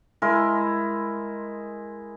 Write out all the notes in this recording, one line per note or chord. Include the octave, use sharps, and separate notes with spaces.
G#3 E4 A#4 C6